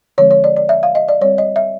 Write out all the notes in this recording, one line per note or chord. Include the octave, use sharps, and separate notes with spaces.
D3 F3 G#3 C4 C#5
C#5
D5
D5
E5
F5
D#5
D5
G3 C4 C#5
D#5
E5